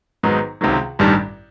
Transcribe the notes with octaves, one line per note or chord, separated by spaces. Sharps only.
G#2 D#3 F#3 B3 D#4
C#2 C3 D#3 F#3
A1 G2 D#3 G3